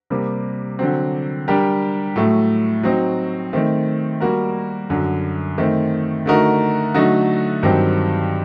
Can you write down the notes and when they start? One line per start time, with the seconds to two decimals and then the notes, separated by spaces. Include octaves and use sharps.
0.10 C3 G3 A#3
0.79 D3 F#3 C4
1.48 G3 D4 G4 A#4
2.16 A2 F#3 A3
2.83 F#3 C4 D#4
3.53 D#3 A3 C4
4.20 G3 A#3 F#4 A#4
4.90 F#2 D3 F#3
5.58 D#3 A3 C4
6.26 D3 A3 D#4 F#4 A#4
6.94 D3 F#3 A3 D#4 F#4
7.63 G2 D#3 F#3 C4 G4